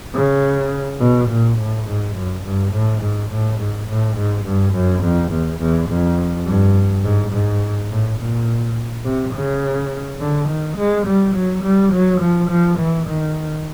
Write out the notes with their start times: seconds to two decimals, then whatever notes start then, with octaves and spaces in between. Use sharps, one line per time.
0.14 C#3
1.01 B2
1.29 A#2
1.58 A2
1.87 G#2
2.16 F#2
2.44 G2
2.73 A2
3.02 G#2
3.31 A2
3.59 G#2
3.89 A2
4.17 G#2
4.45 G2
4.74 F#2
5.03 F2
5.32 E2
5.60 E2
5.89 F2
6.47 G2
7.04 G#2
7.32 G#2
7.90 A2
8.20 A#2
9.05 C3
9.35 C#3
10.21 D3
10.49 D#3
10.77 G#3
11.07 G3
11.36 F#3
11.64 G3
11.93 F#3
12.21 F3
12.50 F3
12.79 E3
13.08 D#3